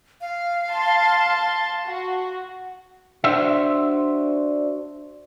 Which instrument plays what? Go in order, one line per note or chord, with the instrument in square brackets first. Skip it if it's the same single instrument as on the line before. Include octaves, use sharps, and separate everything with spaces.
[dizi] F5
[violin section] A5 C6
F#4
[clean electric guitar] D4 F#4 C5 E5